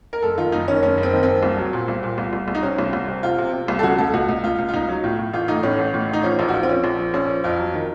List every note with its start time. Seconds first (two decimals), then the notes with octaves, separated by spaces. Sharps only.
0.13 A#4
0.22 F#1 A4
0.38 D#3 F4
0.52 F#1 D#4
0.68 D#3 C#4
0.82 F#1 C#4
0.98 F#1
1.03 C4
1.13 D#3
1.23 C4
1.28 F#1
1.43 C2
1.58 F#3
1.73 A#2
1.88 C2
2.03 A#2
2.18 C2
2.33 C2
2.48 C2
2.55 D#4
2.63 C3 C#4
2.79 C2
2.93 C2
3.08 C3
3.23 C3 F4
3.38 C3
3.53 C3
3.68 C2
3.79 A4
3.83 C#3 F#4
3.98 C#2 A4
4.13 C#2 F#4
4.28 C#2
4.43 C#2 F4
4.58 C#2
4.69 F4
4.73 C#2 D#4
4.88 F#3
5.03 A2 F4
5.19 A2
5.33 A1 F4
5.48 A3 D#4
5.63 A2 C#4
5.79 A1
5.94 A2
6.09 A1 D#4
6.23 F3 C#4
6.39 A#1 D#4
6.49 F#4
6.54 F3 F4
6.63 C4
6.69 F3 C#4
6.84 A#1
6.99 F3
7.14 A#1 C#4
7.29 F3
7.44 F2 F4
7.59 F#3
7.74 D#3